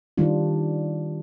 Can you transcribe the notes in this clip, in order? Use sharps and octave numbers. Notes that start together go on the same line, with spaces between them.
D#3 G3 D4 F4